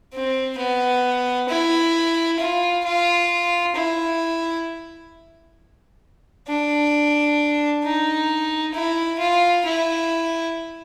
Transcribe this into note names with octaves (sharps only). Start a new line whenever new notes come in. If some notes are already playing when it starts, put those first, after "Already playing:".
C4
B3
E4
F4
F4
E4
D4
D#4
E4
F4
E4